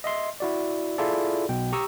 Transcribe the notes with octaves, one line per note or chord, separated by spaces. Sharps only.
D#5 E5 C6
E4 F#4 D5
E4 F4 G#4 A4 D5
B1 B2 G5
G4 A#5 C#6 D#6 E6